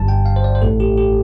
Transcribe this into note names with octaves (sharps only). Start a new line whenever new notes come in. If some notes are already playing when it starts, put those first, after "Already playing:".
Already playing: G1 G2 G3 A5
G5
F5
C5
D5
C5
A1 A2 A3 A4
G4
G4